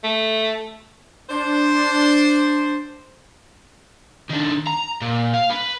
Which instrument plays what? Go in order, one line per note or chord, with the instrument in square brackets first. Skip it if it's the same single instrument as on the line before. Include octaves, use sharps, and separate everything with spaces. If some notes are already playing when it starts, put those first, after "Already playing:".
[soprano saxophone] A3
[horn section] D4 C5
[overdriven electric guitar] D#3 D4
A#5
A#2
F5
B4